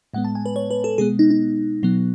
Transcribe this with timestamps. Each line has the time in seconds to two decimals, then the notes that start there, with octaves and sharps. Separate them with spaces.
0.14 A2 G#3 B3 F#5
0.25 A5
0.35 G#5
0.46 B4
0.56 C#5
0.71 B4
0.84 A4
0.98 B2 G#3 B3 G#4
1.19 D#4
1.30 D#4
1.83 B2 F#3 B3